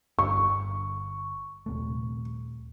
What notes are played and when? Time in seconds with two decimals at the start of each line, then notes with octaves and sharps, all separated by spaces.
0.19 G1 G2 D3 C#6
1.66 D#1 C3 A3